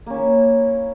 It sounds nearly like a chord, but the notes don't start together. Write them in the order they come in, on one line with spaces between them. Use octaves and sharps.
A#3 C#4 E4